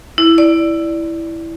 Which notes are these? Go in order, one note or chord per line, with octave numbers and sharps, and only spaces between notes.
E4
D5